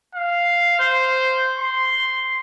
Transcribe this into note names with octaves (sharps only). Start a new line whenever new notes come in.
F5
C5
C6